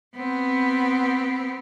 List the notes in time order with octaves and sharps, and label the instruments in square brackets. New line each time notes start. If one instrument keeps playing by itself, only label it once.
[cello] B3 C4